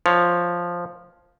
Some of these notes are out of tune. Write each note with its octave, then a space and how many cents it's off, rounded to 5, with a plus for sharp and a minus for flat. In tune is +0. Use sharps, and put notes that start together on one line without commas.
F3 +0 C#5 +10